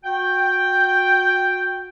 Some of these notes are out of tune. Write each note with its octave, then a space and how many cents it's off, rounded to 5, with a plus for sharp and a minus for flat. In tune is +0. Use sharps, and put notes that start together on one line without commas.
F#4 -25 G5 +0